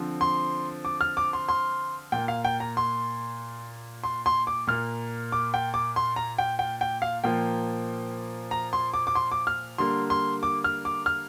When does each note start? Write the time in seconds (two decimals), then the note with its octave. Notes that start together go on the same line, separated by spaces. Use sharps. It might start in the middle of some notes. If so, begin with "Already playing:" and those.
Already playing: D3 F3 C4
0.21 C6
0.85 D6
1.01 F6
1.17 D6
1.33 C6
1.49 C6
2.12 A#2 A#3 G5
2.28 F5
2.45 G5
2.60 A#5
2.77 C6
4.04 C6
4.26 C6
4.47 D6
4.67 A#2 A#3 F6
5.32 D6
5.54 G5
5.74 D6
5.96 C6
6.16 A#5
6.38 G5
6.59 G5
6.81 G5
7.02 F5
7.24 A#2 F3 A#3 G5
8.51 A#5
8.73 C6
8.94 D6
9.07 D6
9.15 C6
9.32 D6
9.47 F6
9.78 D3 G3 A#3 C6
10.10 C6
10.43 D6
10.64 F6
10.85 D6
11.06 F6